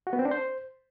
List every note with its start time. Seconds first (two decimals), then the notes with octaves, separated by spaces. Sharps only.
0.07 F#4
0.13 B3
0.19 C4
0.25 D4
0.31 C5